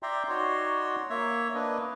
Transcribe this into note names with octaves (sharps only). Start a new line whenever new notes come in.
D5 E5 G5 A#5 C6
D#4 F#4 C#5 D5 C6
A#3 C#5 E5
A#3 D4 B4 D#5